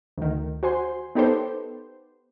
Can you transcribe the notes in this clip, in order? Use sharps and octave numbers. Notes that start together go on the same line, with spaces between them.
D2 D#3
F#4 C5 G#5 C6
B3 D#4 G4 A4 B4 C5